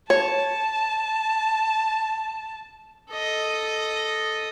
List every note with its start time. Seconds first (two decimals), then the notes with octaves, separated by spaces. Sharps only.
0.10 C#5 A5
3.10 A4 D#5